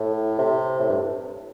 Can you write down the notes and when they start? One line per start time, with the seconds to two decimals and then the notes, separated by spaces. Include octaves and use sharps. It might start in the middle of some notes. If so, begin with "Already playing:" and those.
Already playing: A2
0.39 C3
0.79 A2
0.89 G2